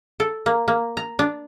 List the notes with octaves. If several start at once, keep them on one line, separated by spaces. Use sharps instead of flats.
A4
A#3
A#3
A#5
D4